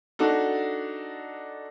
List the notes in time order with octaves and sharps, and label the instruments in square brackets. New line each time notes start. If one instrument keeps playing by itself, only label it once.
[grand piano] D4 D#4 F#4 A4